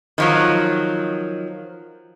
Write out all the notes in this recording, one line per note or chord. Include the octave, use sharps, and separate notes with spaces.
D#3 F3 F#3